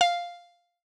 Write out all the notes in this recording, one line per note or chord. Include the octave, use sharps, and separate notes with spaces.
F5